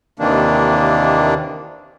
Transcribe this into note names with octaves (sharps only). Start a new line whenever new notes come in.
D#2 C3 D#3 E3 A#3 D4